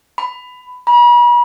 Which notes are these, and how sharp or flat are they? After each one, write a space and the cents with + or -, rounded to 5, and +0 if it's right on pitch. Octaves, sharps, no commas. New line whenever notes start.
B5 +15
B5 -40